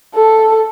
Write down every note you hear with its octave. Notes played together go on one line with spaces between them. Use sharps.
A4